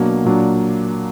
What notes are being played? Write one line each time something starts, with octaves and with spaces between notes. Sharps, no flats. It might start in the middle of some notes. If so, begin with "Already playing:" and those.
Already playing: B2 F#3 A#3 D4
A#2 F#3 A#3 D4